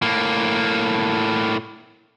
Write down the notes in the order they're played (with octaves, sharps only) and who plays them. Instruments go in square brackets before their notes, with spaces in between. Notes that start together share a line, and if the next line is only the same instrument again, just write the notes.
[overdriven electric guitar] A2 A#3